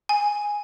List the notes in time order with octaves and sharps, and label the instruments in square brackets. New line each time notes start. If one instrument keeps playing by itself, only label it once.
[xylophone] G#5